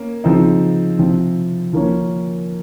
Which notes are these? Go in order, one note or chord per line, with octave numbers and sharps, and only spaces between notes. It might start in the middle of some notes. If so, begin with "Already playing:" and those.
Already playing: A#3 C#4
C#3 F3 C4 D#4
C3 F3 C4
F3 A#3 C#4